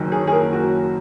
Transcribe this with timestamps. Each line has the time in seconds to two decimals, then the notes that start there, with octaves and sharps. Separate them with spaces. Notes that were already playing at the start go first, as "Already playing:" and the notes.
Already playing: F#1 F#2 D#3 F#3
0.12 G#4
0.27 G#4
0.32 A#4
0.53 F#4